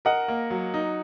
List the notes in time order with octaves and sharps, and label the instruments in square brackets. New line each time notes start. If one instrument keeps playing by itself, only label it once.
[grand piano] A#4 [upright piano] D#5 F#5
[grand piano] A#3
F#3
D#4